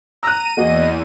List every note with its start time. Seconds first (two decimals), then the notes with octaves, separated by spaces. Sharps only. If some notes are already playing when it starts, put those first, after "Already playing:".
0.23 A#5 E6 F#6 D#7
0.57 E2 A#3 F#4 G#4 D#5